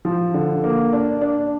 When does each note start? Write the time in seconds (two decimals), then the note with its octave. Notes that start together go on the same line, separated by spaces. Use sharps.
0.05 F3
0.34 D3
0.64 A#3
0.93 D4
1.21 D4